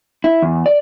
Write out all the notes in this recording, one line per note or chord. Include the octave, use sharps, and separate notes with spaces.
E4
E2
D5